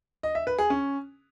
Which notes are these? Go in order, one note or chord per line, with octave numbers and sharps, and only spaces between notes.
D#5
E5
B4
G#4
C#4